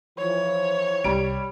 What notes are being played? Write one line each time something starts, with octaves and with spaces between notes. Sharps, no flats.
E3 F3 C#5
C2 G3 D7